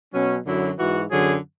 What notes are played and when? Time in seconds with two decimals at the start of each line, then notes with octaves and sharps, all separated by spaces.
0.13 B2 F#3 C#4
0.46 F#2 D3 F#3 E4
0.79 G#2 E3 F#4
1.11 F#2 D3 F#3 G#4